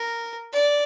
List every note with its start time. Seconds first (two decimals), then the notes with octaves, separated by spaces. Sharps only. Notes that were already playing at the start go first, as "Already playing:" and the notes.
Already playing: A#4
0.53 D5